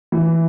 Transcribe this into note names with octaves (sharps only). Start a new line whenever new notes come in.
E3